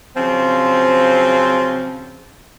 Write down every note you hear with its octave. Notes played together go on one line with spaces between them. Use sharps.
C#3 F3 F#3 C4